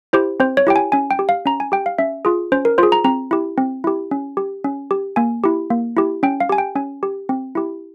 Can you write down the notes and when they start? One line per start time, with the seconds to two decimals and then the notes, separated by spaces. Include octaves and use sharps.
0.13 E4 G4 C5
0.40 C4 C5
0.57 C#5
0.67 E4 G4 G5
0.76 G#5
0.92 C#4 G#5
1.11 G5
1.19 G4
1.29 F5
1.46 C#4 A#5
1.60 G#5
1.72 G4 G5
1.86 F5
1.98 C#4 E5
2.25 F4 G#4
2.52 C#4 C5
2.65 A#4
2.78 F4 G#4 C5
2.92 A#5
3.04 C4 A#5
3.31 E4 G4
3.58 C4
3.84 E4 G4
4.11 C#4
4.37 G4
4.64 C#4
4.91 G4
5.16 A#3 G#5
5.44 E4 G4
5.70 A#3
5.97 E4 G4
6.23 C#4 G5
6.40 F5
6.49 G4 G#5
6.58 G5
6.75 C#4 G#5
7.03 G4
7.29 C4
7.55 E4 G4